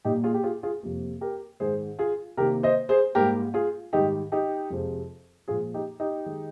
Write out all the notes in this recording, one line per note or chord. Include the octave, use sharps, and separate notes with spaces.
A#2 G3 A#3 D#4 G4
F4 G#4
G4
F4 G#4
F4 G#4
F2 C3 G3 A#3
G4 A#4
G#2 D#3 G#3 G#4 C5
F4 G#4
C3 D#3 A#3 G4 A#4
C5 D#5
G#4 C5
G#2 G3 A#3 G4 A#4
F4 G#4
G#2 D#3 G3 D#4 G4
D#4 G4
F2 C3 F3 G#3
A#2 F3 G#3 F4 G#4
D#4 G4
D#4 G4
D#3 G#3